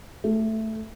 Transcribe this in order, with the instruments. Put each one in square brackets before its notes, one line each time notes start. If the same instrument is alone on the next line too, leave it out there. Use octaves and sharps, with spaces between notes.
[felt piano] A3